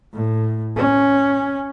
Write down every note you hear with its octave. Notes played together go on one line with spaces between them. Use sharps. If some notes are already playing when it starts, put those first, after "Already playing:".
A2
C#4